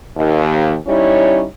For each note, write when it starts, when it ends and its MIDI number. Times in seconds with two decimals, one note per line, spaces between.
0.15 0.74 39
0.87 1.44 55
0.87 1.44 61
0.87 1.44 63
0.87 1.44 64
0.87 1.44 73